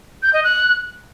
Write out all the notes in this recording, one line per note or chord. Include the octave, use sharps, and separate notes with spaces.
G6
D#5
F#6